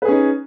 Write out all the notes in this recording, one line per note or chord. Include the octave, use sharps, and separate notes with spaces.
C#4 D#4 G#4 B4